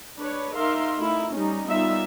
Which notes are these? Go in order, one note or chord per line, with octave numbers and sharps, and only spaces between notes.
D4 B4 C#5
D#4 A#4 E5 F5 C6
A3 D#4 E4
G3 C#4 D#4
G3 B3 D#4 F4 E5